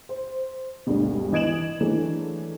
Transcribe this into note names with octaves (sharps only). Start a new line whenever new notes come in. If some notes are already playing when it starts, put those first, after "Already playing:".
C5
G#1 D2 G2 B2
E3 D#5 G#6 D7 E7 F#7
E3 F#3 G#3 A3 D4